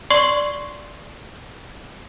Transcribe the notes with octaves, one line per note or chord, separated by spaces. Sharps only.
D5 C6 C#6 C7 F#7